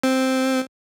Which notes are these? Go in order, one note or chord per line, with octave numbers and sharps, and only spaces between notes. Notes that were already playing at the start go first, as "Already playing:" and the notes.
C4